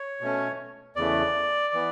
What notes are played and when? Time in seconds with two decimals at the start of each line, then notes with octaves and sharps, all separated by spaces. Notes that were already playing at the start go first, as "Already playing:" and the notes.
Already playing: C#5
0.21 B2 A3 C#4
0.96 E2 C#3 E3 A3 D5
1.73 E3 B3